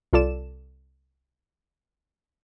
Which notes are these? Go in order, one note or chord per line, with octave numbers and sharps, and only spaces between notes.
C2 F4 A4 D5 E7